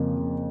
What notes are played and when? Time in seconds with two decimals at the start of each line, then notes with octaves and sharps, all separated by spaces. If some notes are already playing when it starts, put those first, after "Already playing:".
Already playing: F2 C#3 A#3
0.17 C#3